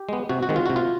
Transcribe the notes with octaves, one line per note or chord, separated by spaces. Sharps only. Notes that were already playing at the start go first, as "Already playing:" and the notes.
Already playing: G4
G#3 B3
C3 F#4
F#4
D#3 G#3 C4
F4
C3 F#4
F4